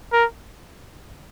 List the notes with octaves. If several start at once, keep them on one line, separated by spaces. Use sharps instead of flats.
A#4